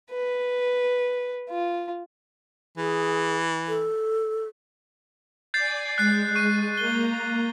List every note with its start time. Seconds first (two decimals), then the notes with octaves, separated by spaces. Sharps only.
0.11 B4
1.50 F4
2.77 E3 G#4
3.68 A4
5.54 D5 G#5 G6 A6 C7
5.98 G#3 F#6 C7
6.35 C#6 D#7
6.77 A#3 A#5 G7